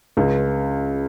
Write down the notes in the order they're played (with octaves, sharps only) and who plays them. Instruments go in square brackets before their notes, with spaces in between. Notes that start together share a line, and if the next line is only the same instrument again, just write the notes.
[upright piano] C#2